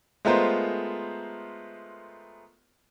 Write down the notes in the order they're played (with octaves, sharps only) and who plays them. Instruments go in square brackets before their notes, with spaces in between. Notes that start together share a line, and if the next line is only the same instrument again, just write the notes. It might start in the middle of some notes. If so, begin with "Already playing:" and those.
[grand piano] G#3 A3 B3 F4 A#4 C5